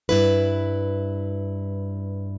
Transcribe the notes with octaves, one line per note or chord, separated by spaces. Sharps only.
G2 E4 B4